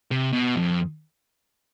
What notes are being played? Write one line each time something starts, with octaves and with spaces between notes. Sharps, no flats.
C3
B2
F2